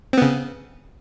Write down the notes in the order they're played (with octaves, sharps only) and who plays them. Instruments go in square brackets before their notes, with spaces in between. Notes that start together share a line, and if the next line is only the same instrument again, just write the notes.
[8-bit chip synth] C4
B3
C#3